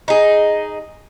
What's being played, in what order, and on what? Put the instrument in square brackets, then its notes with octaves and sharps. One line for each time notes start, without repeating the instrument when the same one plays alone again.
[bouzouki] D#4 G#4